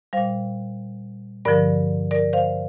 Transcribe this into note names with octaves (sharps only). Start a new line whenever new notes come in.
A#2 G3 C5 F5
G2 D3 F3 A#4 D5
A#4 D5
C5 F5